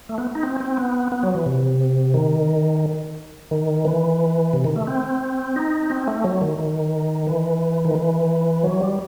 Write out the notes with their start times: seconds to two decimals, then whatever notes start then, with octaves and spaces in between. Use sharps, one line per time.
0.09 A3
0.18 B3
0.35 D#4
0.43 C4
0.60 C4
0.77 B3
1.12 B3
1.23 F#3
1.35 E3
1.46 C3
2.14 D#3
3.51 D#3
3.85 E3
4.53 C3
4.64 D#3
4.76 A3
4.87 C4
5.56 D#4
5.90 C4
6.07 A3
6.24 F#3
6.41 D#3
6.59 D#3
7.27 E3
7.85 D#3
7.95 E3
8.64 F#3
8.81 G3